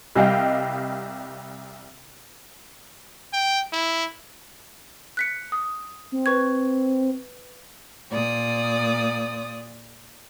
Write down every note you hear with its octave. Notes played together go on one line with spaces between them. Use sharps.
C2 G3 D#5 F5 G5
G5
E4
F#6 B6 C#7
D#6
C4
B4 C#6 G#6
A#2 D5 D#6